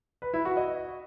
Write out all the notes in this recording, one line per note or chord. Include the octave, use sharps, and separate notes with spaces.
B4
E4
F#4
D#5